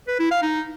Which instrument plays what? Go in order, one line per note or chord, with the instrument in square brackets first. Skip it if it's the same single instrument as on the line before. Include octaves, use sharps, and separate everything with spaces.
[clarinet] B4
E4
F5
D#4